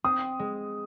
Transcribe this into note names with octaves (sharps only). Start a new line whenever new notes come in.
C4 D#6
G#3